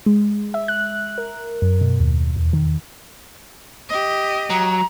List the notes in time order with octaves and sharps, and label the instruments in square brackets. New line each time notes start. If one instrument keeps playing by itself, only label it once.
[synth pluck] G#3
E5
F#6
A#4
F#2
B2
D#2
E2
D#3
[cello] G4 D#5
[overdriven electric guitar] F#3 [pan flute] A#5